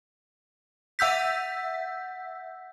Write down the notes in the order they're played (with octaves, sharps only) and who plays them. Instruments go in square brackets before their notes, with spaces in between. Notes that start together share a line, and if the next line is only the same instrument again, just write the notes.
[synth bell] E5 F#5 E6 G6 B6